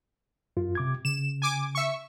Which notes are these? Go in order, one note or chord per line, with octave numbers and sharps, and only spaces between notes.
F#2 F4
C3 D6 G#6
C#3 E7
G#5 D6
E5 C#6